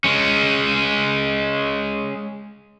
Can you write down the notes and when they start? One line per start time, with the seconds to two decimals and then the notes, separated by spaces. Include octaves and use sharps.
0.04 G#3 C#4